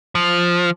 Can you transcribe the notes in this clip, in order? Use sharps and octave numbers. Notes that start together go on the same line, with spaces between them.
F3